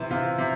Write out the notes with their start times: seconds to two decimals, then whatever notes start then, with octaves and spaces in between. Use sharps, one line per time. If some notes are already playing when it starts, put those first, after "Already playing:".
Already playing: C3 E3 C5
0.11 C3 F4
0.38 C3